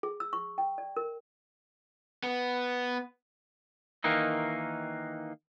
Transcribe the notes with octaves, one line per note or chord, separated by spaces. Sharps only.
G#4
E6
C#6
G5
D5
A#4
B3
D#3 E3 A#3 D#4